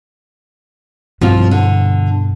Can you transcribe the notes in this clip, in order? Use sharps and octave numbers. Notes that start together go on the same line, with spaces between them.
G2 B2 F3 C4 F4
D3